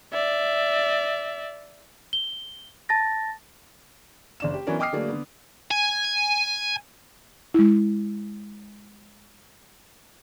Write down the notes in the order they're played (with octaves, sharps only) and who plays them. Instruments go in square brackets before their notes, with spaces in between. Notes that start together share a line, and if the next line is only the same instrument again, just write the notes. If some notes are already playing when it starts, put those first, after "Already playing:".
[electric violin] D5 E5
[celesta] G7
A5 A6 A#6
[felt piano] F#1 D4 E7
G4
E3 F#3 B3 C#4 D4 A#4
D#5 G5 D6 D#6 F6 C7
D3 F#3 A3 A#3 D4 G#4
D3 B3
[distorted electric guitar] G#5
[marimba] G#3 E4